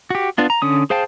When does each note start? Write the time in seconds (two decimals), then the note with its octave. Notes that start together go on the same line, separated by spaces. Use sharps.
0.10 F#4 G4
0.38 B3 D4 F4
0.50 A#5
0.62 D3 C#4 D#6
0.90 G#4 C5 F5 G5 A5